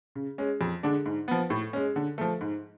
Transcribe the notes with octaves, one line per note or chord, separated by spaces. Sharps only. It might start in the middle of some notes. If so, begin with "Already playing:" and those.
C#3
G#3 C#4
F2
D3 G#3 D4
G#2
F3 B3
A2
G#3 C#4
D3
F3 A3
G#2